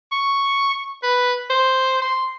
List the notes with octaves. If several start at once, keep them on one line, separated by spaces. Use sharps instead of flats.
C#6
B4
C5
C6